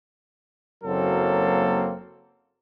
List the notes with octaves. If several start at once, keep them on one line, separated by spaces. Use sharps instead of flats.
F#1 F#3 A#3 C4 A4